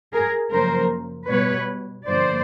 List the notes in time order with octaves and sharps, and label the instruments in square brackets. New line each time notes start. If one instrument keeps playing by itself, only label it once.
[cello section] G#4 A#4
F#2 C#3 F3 A#3 A#4 C5
B2 G3 B3 B4 C#5
G2 D3 F3 A#3 C5 D5